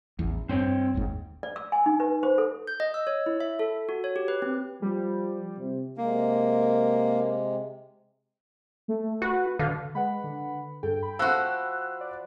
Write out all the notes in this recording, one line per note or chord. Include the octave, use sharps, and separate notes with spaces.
A1 E2
G2 C4 C#5 G5
G1 D#2 G#2
D5
E6
G#5
D#4
B4
C5
A4
G6
D#5
E6
C#5
E4
E5
A4
F#4
C#5
G4
B4
C4
F3 G3
C3
C3 G#3 A#3
A3
F#4 B4
D3 F5
G#3 B4 F#5 B5
D3
G2 A4 G5
B5
F3 F#4 E6 F#6
D5